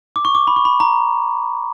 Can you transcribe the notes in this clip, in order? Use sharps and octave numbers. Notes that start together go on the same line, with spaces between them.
D6
C#6
D6
B5
C#6
B5
A#5